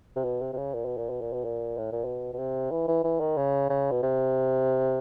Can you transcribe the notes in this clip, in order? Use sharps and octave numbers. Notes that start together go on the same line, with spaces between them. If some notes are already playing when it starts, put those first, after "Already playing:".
C3
B2
C3
C3
C#3
A#2
B2
A#2
B2
A#2
B2
A#2
A2
A#2
B2
B2
C3
E3
E3
E3
D#3
C#3
C#3
B2
C3